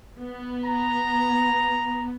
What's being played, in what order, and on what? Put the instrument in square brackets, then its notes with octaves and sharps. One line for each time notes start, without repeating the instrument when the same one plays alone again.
[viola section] B3
[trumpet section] A#5